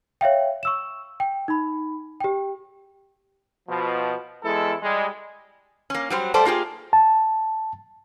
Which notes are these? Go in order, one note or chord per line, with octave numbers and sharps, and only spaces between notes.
C#5 E5 F5 G5
C#6 E6 E7
G5
D#4 B5
G4 G5
B2 F3
E2 G#3 E4 A4
G3 G#3
A#3 C#4
F#3 G3 C5
G3 A3 A4 C5 D5
A#3 F4 G4 G#4
A5